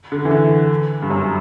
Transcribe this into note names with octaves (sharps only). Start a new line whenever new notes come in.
D3
E3
D3
G2
F#2